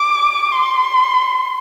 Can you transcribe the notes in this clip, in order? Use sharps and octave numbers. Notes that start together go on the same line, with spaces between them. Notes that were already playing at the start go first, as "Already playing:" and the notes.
Already playing: D6
C6